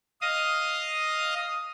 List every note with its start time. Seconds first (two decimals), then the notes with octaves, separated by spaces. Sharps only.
0.21 D#5 F5 D#6